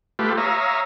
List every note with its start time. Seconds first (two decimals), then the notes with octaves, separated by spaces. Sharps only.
0.19 A3 F4 G4 B4
0.38 C#5 E5 F5 A#5 D#6